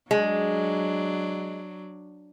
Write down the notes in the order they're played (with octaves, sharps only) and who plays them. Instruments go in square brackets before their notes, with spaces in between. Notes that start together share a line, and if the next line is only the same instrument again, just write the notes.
[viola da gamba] F#3 D4 [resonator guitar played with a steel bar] G#3